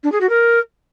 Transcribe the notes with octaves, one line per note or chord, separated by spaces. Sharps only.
D4
G#4
F#4
A#4